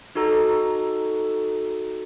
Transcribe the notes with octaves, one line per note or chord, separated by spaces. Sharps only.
D#4 F#4 A4 A#5